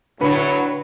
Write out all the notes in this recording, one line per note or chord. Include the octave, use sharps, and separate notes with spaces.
A2 D3 F#3 B4 C#7